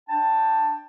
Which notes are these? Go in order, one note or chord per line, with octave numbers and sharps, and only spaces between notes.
D4 G5 A5